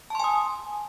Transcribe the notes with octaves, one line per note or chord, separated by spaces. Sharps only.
G#5 A5 C6 D#6